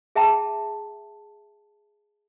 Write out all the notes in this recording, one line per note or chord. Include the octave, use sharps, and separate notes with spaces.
G#4 E5 G5 A5 A#5